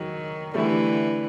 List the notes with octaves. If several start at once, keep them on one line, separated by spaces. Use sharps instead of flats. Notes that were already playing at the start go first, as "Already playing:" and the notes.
Already playing: D#3 F#3 G#3
D3 E3 G3 A3